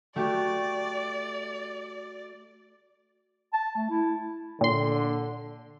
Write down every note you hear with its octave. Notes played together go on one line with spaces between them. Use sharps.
A3 F#4 G4 D5
A5
A3
E4
A#2 D3 C6